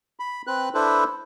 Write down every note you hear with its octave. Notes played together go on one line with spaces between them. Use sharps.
B5
C4 B4 F#6
D4 E4 A4 B4 C5